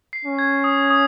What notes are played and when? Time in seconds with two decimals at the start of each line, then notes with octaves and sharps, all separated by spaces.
0.13 C7
0.25 C#4
0.39 G#6
0.64 D#6
0.90 D#6